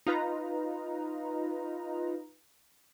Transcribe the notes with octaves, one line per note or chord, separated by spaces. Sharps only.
D#4 F4 B4 A#5